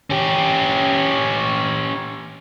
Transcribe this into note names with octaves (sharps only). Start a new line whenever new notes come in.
C#4 G4